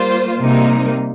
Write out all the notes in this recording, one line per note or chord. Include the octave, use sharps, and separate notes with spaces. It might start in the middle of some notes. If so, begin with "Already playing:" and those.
Already playing: G3 A#3 F4 C5
C3 G3 A#3 D#4